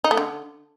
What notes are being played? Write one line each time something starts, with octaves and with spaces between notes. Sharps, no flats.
D#4
A3
D3